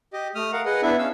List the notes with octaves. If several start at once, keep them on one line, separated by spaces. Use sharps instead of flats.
G4 D#5
A3 D#6 F6
A#4 F5 F#5
G#4 B4 D#5 F#5
B3 D4 E4 E5
C#4 F5 E6